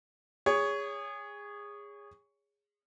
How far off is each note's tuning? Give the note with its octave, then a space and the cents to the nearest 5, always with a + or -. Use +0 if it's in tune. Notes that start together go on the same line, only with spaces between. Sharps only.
G#4 -20 C#5 +15